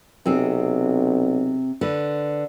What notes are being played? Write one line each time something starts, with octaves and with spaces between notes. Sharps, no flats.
B1 C3 C4 G#4
D3 B4